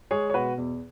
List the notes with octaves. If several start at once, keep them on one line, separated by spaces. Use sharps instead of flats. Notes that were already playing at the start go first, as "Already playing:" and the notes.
G#3 G#4 C#5
C#5
B2 F#4 B4
E2